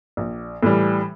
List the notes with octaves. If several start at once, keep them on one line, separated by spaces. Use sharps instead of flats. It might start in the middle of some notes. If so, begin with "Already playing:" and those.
A#1
A2 E3 G3